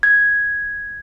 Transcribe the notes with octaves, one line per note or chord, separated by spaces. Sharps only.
G#6